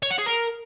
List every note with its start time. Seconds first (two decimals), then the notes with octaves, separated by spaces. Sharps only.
0.03 C#5
0.11 F#5
0.18 G#4
0.26 A#4